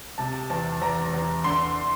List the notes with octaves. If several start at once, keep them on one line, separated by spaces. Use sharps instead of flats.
C3 A5
E2 A5
E2 A#5
E2
D3 C6